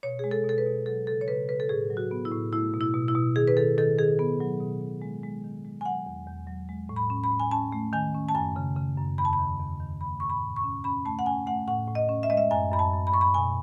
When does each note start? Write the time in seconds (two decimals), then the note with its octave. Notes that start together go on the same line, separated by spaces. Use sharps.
0.03 B2 C#5
0.19 G#3 G#4
0.31 A4
0.45 B2 A4
0.58 B4
0.66 B2
0.86 F#3 A4
1.07 C#3 A4
1.21 C#5
1.27 C#3 B4
1.48 C#3 B4
1.60 A4
1.69 A2 G#4
1.90 F#3
1.97 F#4
2.11 B3
2.25 E4
2.32 A2
2.53 A3 E4
2.73 B2
2.81 E4
2.94 B2
3.08 E4
3.15 B2
3.36 D#3 G#4
3.48 B4
3.57 D#3 A4
3.77 D#3 A4
3.98 D#3 G#4
4.19 B3
4.40 F#3
4.60 B2
4.81 B2
5.02 G#3
5.23 G#3
5.44 D#3
5.65 G#3
5.81 G#5
5.85 F#3 F#5
6.06 E2
6.27 E2
6.47 F#3
6.69 G#3
6.89 A2
6.96 B5
7.10 C#4
7.24 B5
7.31 A2
7.40 G#5
7.51 C#4 A5
7.72 A3
7.93 D#3 G#5
8.14 C#4
8.29 A5
8.35 F#2 G#5
8.56 C#3
8.76 C#3
8.97 F#2
9.18 E2 B5
9.25 A5
9.33 B5
9.39 D#3
9.59 E2
9.80 D#3
10.01 A3 B5
10.20 A2 C#6
10.30 B5
10.43 A2
10.56 C#6
10.64 C#4
10.84 C#4 B5
11.05 A3 A5
11.19 F#5
11.25 C#4 G#5
11.47 A3 F#5
11.68 A2 F#5
11.88 A2
11.95 D#5
12.09 C#4
12.23 E5
12.30 G#3 D#5
12.37 E5
12.51 F#2 G#5
12.72 F#2 B5
12.79 A5
12.93 F#2
13.07 B5
13.13 F#2 C#6
13.21 B5
13.34 B2 G#5